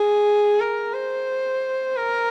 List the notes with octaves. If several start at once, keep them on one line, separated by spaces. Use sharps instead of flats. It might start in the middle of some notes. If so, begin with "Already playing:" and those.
Already playing: G#4
A#4
C5
A#4